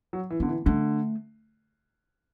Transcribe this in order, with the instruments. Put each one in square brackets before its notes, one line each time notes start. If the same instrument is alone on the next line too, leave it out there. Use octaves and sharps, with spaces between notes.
[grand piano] F#3
E3
[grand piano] D3 [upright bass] B3
[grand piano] E3
[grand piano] D3 [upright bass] A3